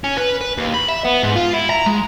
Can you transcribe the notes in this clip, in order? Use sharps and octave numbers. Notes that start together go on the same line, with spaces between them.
C#4
B4
B4
D#2
B5
E5
B3
G#2
F4
E4
A#5
G#3